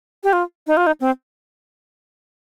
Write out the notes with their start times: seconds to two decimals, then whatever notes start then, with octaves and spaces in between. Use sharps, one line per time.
0.24 G4
0.33 F4
0.67 D#4
0.77 F4
0.87 D#4
1.00 C4